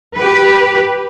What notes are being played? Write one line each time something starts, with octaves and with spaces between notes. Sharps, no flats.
G4 B4